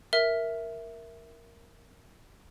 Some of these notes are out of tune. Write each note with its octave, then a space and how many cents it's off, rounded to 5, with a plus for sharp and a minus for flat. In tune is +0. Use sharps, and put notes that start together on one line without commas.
A#4 +0 E5 +0